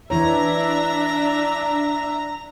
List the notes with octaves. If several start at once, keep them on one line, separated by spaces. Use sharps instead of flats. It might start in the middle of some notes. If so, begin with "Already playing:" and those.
E3 D4 E4 C#5 E5 A#5